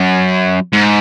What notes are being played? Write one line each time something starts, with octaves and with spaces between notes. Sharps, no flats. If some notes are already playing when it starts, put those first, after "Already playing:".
Already playing: F#2
G#2